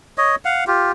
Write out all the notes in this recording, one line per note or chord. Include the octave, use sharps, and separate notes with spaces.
C#5 D#5
F5 F#5
F4 G4